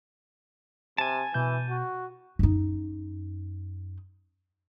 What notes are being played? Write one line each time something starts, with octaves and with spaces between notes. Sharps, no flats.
C3 G#5 A5
B2 E3 G6
F#4
F#2 D#4